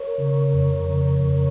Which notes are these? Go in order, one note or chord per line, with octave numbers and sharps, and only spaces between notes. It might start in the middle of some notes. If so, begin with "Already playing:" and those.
Already playing: A#4 C#5
C#3
F2
C#3
F2